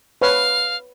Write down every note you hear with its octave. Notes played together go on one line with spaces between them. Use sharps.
B4 C#5 F5